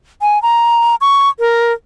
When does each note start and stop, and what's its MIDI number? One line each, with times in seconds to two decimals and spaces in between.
0.22 0.41 80
0.43 0.95 82
1.01 1.29 85
1.39 1.72 70